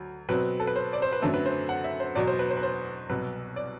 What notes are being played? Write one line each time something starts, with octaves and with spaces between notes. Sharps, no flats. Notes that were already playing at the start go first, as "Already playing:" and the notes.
Already playing: D2 F#3
B2 F#3 C4 B4
A4
B4
C5
D5
C5
B4
F#2 D3 F#3 A3 C4 A4
B4
C5
F#5
E5
C5
E2 B2 F#3 D5
C5
B4
C5
B4
C5
C2 B2 F#3 B4
D5